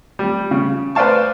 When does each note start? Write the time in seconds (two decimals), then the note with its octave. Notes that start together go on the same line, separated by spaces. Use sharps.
0.19 G3
0.51 C#3
0.95 B4 C5 D5 F5 A5 C#6